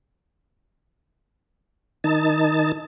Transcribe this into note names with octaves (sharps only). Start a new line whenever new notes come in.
D#3 D#4 A5